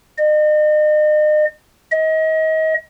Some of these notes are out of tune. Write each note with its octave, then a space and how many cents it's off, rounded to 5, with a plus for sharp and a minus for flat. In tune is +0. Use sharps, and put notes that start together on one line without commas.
D#5 -40
D#5 +30